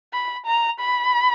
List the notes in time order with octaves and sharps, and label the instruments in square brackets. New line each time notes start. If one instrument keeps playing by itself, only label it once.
[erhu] B5
A#5
B5